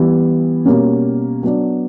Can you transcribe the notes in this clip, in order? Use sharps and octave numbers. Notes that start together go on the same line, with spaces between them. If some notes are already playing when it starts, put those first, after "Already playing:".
Already playing: E3 G3 B3 E4
B2 G3 A#3 C#4
F#3 B3 D4